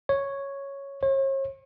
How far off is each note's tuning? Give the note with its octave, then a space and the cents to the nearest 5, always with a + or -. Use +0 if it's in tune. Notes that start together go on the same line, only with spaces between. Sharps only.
C#5 +0
C#5 -40